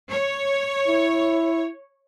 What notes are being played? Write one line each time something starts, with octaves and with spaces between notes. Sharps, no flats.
C#5
E4